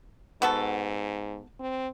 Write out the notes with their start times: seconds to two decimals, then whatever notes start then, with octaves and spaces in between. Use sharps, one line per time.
0.42 G#2 B3 F#4 A4
1.60 C4